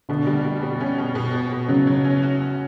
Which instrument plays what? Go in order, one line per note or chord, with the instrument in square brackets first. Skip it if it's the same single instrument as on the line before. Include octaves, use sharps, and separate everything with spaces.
[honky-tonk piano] B2 [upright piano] D3
[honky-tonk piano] G3
G3
B2
C#4
B2
B2
B2
B2
[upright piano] C#3 [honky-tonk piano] F#3
[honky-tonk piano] F#3
C#4
F#4
F#4